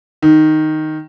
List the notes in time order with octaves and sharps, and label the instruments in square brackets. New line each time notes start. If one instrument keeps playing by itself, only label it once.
[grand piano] D#3